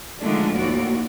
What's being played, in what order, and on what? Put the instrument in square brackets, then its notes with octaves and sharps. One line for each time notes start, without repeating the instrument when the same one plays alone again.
[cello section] D3 D#3 F3 G#3 A3 D4
D#2 A2 A#3 F#4 D5